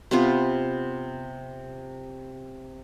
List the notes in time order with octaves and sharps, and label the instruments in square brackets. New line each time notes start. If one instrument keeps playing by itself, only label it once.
[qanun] C3 B3 F4